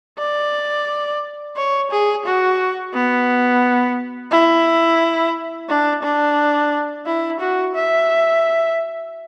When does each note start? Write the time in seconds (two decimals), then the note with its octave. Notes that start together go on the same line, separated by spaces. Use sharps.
0.19 D5
1.56 C#5
1.91 G#4
2.25 F#4
2.94 B3
4.31 E4
5.69 D4
6.03 D4
7.06 E4
7.40 F#4
7.75 E5